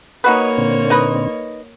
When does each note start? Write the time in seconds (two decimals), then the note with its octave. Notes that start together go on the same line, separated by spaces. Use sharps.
0.24 A#3 D#4 F#4 B4 C#5 D#5
0.57 A#2 D3 C4
0.90 D#4 B4 D#5